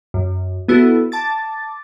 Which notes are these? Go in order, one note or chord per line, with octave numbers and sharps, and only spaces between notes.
F#2
B3 E4 F#4 A4
A5 D6 A6